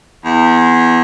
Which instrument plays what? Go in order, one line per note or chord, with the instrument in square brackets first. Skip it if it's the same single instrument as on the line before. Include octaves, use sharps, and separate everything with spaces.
[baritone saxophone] E2